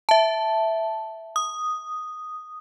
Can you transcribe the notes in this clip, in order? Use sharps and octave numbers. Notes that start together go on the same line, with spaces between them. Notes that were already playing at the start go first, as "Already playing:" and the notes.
E5 A5
D#6